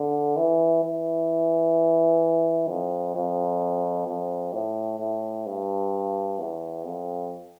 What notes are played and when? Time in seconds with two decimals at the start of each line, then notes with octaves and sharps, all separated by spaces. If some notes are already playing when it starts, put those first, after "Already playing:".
Already playing: D3
0.37 E3
0.83 E3
2.68 F2
3.15 F2
4.07 F2
4.53 A2
4.99 A2
5.46 G2
6.39 E2
6.85 F2